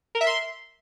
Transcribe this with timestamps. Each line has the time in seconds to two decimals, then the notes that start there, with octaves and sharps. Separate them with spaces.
0.15 A#4
0.21 E5
0.27 C6